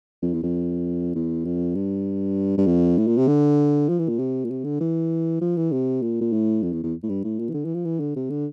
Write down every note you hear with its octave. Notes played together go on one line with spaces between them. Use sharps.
F2
E2
F2
E2
F2
G2
G2
F2
A2
A#2
C3
D3
F3
E3
A#2
C3
A#2
C3
D3
E3
F3
E3
C3
A#2
A#2
A2
F2
E2
E2
A2
G2
A2
A#2
E3
D3
E3
F3
E3
D3
C3
D3